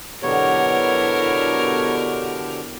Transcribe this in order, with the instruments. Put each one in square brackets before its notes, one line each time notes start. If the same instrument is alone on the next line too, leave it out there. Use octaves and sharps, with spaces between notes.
[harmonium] B2 D3 G4 [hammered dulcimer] F#3 B3 [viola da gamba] E4 A#4 [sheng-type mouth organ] C#5